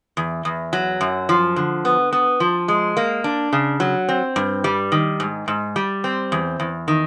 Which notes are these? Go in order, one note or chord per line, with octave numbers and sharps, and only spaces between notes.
E2
E2
F#3
F#2
F3
D3
B3
B3
F3
G#3
A#3
D4
C#3
F#3
C4
G2
G3
D#3
G#2
G#2
G3
C4
E2
E2
D#3